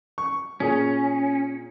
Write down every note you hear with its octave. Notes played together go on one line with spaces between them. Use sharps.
C#6
A#2 C#4 G#4